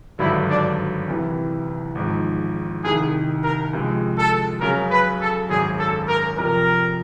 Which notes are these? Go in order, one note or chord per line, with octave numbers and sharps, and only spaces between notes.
G#1 G2 D3 F#3 E4
D4
C2 C3 E3
G#1 G#2 F3
C2 C3 D#3 G#4
A#4
C#2 C3 F3 G#3
A4
F#2 C#3 F#3 A#4
B4
A4
G#1 F#2 C#3 G#4
A4
A#4
F2 C3 F3 A#4